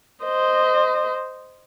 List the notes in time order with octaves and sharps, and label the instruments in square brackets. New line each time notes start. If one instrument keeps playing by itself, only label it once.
[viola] C5 D#5